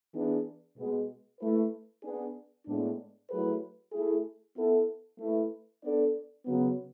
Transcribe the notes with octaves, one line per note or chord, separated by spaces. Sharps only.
E3 B3 D4 G#4
B2 G#3 B3
A3 E4 B4
B3 D4 G#4
A2 G#3 B3 D4
F#3 A3 E4 G#4 B4
A3 E4 G#4
B3 E4 A4
A3 E4 B4
B3 D4 A4 D5
C#3 F#3 B3